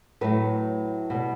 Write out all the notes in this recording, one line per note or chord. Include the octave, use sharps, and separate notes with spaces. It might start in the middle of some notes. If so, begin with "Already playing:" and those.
A2 F#3 A3 B4
B2 G3 B3